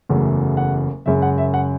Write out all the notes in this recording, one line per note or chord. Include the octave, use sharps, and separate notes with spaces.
F#1 E2 C#3 F#3 A3
F#5
F#1 F#2 C#3 G#3 E5
F#5
E5
F#5